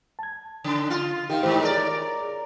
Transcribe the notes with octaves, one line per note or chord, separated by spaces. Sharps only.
A5 G#6
C#3
F4
D#3 G4 F5
G#2 D#3 G4 C5
G#4 A#4 C#5 D5 A#5